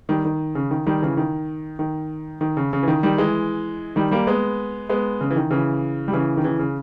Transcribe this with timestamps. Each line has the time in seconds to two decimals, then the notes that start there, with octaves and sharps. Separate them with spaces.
0.09 D#3 G3
0.25 D#3
0.55 C#3
0.71 D#3
0.86 D#3 G3
1.02 C#3 E3
1.17 D#3
1.79 D#3
2.41 D#3
2.57 C#3
2.73 C#3
2.83 E3
2.88 D#3
3.03 D#3 G3
3.18 E3 G#3
3.96 D#3 G3
4.11 G3 A#3
4.27 G#3 B3
4.89 G#3 B3
5.21 C#3
5.31 E3
5.36 D#3
5.51 C#3 E3
6.08 G3
6.13 C#3 E3
6.37 D#3
6.44 C#3 E3
6.59 C#3